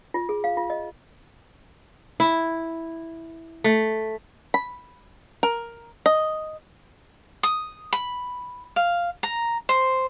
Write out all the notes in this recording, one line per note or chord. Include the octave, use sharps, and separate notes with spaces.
F4
G#4
F5
F4
D#5
E4
A3
B5
A#4
D#5
D#6
B5
F5
A#5
C5